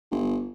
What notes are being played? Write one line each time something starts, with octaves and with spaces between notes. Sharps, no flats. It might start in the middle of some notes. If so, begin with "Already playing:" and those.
G1